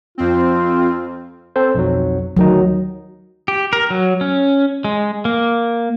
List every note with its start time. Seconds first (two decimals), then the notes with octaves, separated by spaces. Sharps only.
0.18 F2 C4 F4
1.56 C4 A4 C5
1.75 B1 F2 F#3
2.37 D2 D#3 F#3 D#4
3.48 G4
3.73 A#4
3.90 F#3
4.21 C#4
4.85 G#3
5.25 A#3